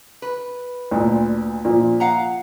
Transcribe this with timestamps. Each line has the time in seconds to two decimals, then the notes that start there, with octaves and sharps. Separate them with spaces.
0.22 B4
0.91 D2 A#2
1.65 A#2 F3
2.00 F5 F#5 A#5